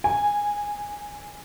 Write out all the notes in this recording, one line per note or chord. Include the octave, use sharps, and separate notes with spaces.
G#5